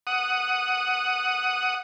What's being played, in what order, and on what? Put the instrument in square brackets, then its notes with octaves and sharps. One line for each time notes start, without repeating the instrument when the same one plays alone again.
[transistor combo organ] F#5 D#6